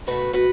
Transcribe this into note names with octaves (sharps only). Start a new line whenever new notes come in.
B2 A3 F#4 B4
F#4 B4